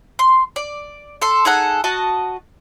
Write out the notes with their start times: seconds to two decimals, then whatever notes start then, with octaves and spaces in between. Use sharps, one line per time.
0.19 C6
0.56 D5
1.22 A4 C6
1.45 D#4 G#4 A4 F#5
1.84 F#4 D#5 A5